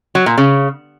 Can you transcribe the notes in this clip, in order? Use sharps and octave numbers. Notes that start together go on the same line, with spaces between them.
F#3
A#2
C#3